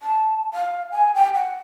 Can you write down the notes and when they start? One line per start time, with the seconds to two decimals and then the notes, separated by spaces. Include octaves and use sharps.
0.01 A5
0.54 F5
0.92 G#5
1.15 G5
1.35 F#5